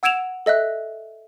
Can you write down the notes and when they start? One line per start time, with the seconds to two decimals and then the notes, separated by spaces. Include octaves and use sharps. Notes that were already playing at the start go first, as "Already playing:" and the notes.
0.03 F#5 E6 G#6 D7 E7 F7
0.46 A4 D#5 E5 F#6